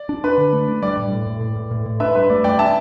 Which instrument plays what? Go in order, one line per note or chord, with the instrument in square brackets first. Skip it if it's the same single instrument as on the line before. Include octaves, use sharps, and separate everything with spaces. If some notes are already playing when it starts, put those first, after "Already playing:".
Already playing: [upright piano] D5
[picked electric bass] D4
[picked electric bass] D4 [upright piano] B4
[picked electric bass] D3
A3
D4
[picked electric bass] G3 [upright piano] D5
[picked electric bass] A2
A2
A2
A2
A2
A2
A2
[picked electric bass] D4 [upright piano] B4 E5
[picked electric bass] G2 [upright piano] B4
[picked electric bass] A3 [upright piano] D5
[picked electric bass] G2 [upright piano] D5 G5
[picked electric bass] D4 [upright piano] E5 A5